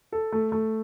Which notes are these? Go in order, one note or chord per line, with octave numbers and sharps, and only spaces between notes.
A4
A3
A3